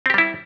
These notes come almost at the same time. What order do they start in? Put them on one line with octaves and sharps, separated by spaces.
C4 G4 G3 E4